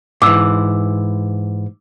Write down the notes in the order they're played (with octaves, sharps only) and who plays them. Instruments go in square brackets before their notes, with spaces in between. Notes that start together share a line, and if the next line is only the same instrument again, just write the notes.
[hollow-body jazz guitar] G#2 E3 [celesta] D6 E6